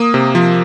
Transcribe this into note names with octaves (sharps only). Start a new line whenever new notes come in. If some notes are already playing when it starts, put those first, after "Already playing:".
Already playing: A#3 D#6
C3
F3